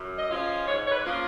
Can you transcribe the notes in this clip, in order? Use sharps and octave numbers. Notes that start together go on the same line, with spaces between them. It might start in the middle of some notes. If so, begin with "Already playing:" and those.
Already playing: F#2
D#5
F3 G#3 C#4 F4
G#2 C#5
C#5
B4
F3 A#3 C#4 F4